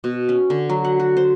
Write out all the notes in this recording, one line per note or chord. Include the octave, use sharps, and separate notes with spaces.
B2
C#4
D3
F#3
F#5
F#4
C5